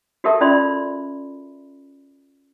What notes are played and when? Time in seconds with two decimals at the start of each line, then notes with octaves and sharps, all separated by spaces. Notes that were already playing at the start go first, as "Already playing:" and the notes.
0.24 F#4 G4 A4 A#4 E5 A5
0.41 C#4 F4 D5 E5 B5 C6